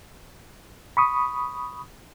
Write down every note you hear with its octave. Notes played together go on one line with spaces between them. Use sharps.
B5 C#6 D#6